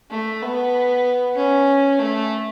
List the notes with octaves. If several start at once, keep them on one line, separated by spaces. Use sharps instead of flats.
A3
B3
C#4
A3